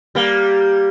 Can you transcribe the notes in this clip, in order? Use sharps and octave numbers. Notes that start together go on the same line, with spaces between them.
G3 A#3